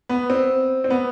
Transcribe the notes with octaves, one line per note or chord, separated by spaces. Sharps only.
B3
C4
C4
B3